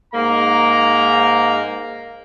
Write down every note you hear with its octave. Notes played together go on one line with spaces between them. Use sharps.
G#2 A#3 A#5